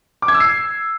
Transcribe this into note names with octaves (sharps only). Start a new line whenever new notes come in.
D6
G#6
E6
C7